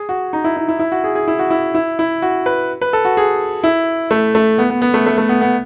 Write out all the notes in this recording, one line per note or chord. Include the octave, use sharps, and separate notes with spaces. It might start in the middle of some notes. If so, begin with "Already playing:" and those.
Already playing: G#4
F#4
D#4
E4
E4
E4
E4
F#4
G#4
G#4
E4
F#4
E4
E4
E4
F#4
B4
B4
A4
F#4
G#4
E4
A3
A3
B3
B3
B3
A3
A3
A3
B3
B3